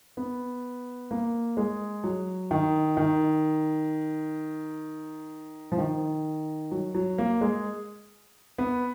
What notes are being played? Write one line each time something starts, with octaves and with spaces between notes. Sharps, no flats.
B3
A#3
G#3
F#3
D#3
D#3
F3
D#3
F#3
F#3
A#3
G#3
B3